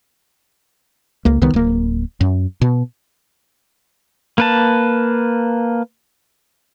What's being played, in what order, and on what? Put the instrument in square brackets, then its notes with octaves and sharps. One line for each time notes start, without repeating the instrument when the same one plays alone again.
[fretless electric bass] C#2 A#3
C2 D#3 B3
D1 A#3
F#2
B2
[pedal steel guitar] A#3 B4 A5